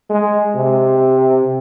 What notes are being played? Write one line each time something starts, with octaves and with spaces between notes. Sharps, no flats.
G#3
C3